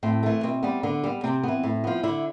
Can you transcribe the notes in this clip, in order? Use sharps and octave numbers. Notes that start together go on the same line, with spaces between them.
A2 C4
E3 A3
B2 C4
G3 B3
D3 B3
G3 B3
C3 C4
E3 B3
A2
F3 B3
D3 E4